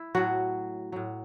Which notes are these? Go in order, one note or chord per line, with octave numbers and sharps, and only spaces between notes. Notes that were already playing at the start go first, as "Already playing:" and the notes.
Already playing: E4
A2 F#3 F#4
A2 F#3